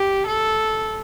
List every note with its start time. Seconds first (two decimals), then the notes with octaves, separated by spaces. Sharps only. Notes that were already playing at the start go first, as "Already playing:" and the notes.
Already playing: G4
0.27 A4